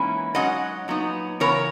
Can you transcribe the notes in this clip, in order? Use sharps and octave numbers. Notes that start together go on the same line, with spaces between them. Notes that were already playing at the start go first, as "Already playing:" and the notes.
Already playing: G#2 E3 A#3 C#4 E4
G#2 F#3 C#4 D#5 F#5
A#2 F#3 B3 D#4
C#3 E3 B3 A#4 C#5